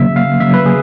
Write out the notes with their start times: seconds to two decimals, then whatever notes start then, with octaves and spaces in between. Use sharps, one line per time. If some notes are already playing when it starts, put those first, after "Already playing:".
Already playing: C#3 F#3 A#3 E5
0.16 F5
0.40 C#3 F#3 A#3 E5
0.54 B4
0.66 G#4